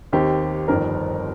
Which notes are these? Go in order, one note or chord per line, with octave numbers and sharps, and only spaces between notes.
D#2 D#3 C4 D#4 G4
G1 F2 D#3 C4 A#4